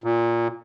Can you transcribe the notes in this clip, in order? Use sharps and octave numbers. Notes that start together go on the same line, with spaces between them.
A#2